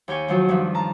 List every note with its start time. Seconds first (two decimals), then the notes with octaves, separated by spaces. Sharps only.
0.08 D#2 G4 G5 G#5 C#6
0.28 D#3 F3 F#3 F4
0.49 G2 D#3 F3
0.74 A5 A#5 F6